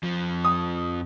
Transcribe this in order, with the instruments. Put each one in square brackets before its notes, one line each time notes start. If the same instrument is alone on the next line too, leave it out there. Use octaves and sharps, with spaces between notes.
[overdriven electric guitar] F2 F3
[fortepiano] D#6